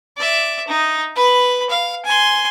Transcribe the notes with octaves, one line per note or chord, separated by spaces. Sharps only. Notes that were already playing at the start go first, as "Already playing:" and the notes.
D5 E5
D#4
B4 B5
F5
G#5 C6